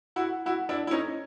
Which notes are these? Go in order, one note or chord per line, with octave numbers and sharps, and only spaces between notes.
E4 F#4
E4 F#4
D4 E4
E4
C#4 D#4